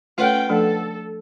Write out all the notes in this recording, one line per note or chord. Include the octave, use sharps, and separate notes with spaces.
A3 C#4 F4 A4 B4 F#5 G5
F3 A3 D4 A4